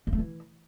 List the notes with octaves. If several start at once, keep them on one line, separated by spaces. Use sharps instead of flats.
A#3
A3
E3